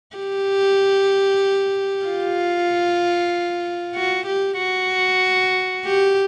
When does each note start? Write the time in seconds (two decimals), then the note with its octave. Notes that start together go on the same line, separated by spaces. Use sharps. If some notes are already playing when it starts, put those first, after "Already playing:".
0.17 G4
2.06 F4
3.95 F#4
4.27 G4
4.58 F#4
5.85 G4